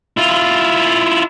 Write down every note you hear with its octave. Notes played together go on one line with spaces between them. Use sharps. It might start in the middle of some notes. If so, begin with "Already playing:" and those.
E4 F4